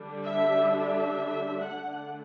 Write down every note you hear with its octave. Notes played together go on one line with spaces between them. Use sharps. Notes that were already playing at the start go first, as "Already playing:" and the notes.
Already playing: D3 G3 D4
E5
E5
D3 A3 D4 F#5